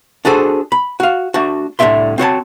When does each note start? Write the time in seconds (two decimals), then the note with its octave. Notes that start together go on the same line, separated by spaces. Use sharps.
0.25 D4 F#4 G#4 A4 C5
0.72 B5
1.00 F#4 F5
1.34 A3 D4 F#4
1.79 C2 A2 D3 F#4 E5 C6
2.18 C4 F#4 C#5 A5